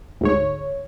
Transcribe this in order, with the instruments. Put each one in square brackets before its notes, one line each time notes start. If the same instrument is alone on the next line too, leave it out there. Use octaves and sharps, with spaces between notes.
[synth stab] D2 G#2 C#5